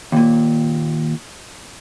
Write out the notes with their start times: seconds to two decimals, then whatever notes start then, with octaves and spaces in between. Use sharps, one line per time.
0.12 D#2 A#2